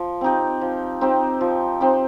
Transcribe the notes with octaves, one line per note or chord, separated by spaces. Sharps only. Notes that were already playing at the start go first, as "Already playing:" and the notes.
Already playing: F3
C4 D#4 G4
F3
C4 D#4 G4
F3
C4 D#4 G4